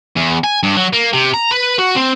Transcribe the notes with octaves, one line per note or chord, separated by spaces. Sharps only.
E2
G#5
G2
F#3
A#3
C3
A#5
B4
F#4
C4